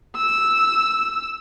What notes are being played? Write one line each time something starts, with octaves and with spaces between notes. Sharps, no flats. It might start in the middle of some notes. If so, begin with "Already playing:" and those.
E6